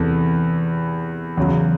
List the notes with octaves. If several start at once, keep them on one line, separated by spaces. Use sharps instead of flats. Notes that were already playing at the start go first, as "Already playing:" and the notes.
Already playing: E2 C3 E3 A4
E2 C#3 F#3